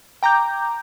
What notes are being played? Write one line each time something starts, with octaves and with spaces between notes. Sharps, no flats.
G5 A#5 D6 G6